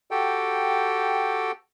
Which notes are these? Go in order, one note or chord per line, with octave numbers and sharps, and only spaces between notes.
F#4 G4 A4 G5